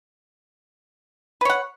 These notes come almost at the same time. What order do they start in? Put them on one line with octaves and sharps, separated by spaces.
B4 C#5 F#5